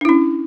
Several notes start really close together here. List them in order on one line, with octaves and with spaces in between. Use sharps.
D4 E4 C#4